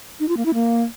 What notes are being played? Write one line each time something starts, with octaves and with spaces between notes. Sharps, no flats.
D#4
F4
A#3
E4
A#3